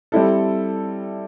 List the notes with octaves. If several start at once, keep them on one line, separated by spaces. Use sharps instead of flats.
G3 C4 E4 A4